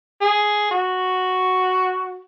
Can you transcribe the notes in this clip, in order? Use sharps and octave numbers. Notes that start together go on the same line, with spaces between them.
G#4
F#4